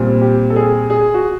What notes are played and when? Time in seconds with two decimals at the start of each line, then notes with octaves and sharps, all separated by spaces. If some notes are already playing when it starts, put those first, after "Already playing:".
Already playing: A#2 G3 C4
0.21 G4
0.50 A4
0.56 G#4
0.90 G#4
1.14 F#4